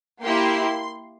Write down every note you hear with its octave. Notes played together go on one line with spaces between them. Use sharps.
A#3 E4 G4 C6